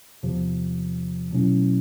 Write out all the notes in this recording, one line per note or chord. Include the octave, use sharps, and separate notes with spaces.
E2 C3 F3
B2 F#3 A3 C#4 E4